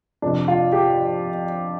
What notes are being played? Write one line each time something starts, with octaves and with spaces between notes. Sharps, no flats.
F2 C3 D4
F4
G4